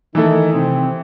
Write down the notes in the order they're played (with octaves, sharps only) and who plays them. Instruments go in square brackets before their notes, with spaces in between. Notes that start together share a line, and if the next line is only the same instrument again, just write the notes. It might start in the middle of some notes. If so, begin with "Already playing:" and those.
[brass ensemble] D#3 D#4 [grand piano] E3 A3 E4 A4
[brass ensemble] C3 C4